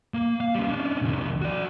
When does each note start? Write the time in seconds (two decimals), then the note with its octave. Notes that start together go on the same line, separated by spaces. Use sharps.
0.14 A#3
0.40 F5
0.55 G3 C#4
0.68 C#4 D4
1.02 C2 D#3
1.42 F#4 D5